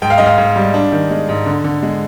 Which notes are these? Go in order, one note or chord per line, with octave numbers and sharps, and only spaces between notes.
G#2 G5
F5
G#2 D#5
F5
G#2
G3
D4
D#3
G#3
G#2
D3
D3
G#3